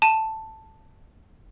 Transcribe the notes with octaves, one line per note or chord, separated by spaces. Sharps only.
A5 D#7